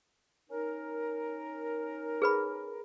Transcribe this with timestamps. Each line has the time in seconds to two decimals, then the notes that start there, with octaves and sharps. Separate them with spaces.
0.50 C#4 D#4 A#4
2.22 G#4 B4 B5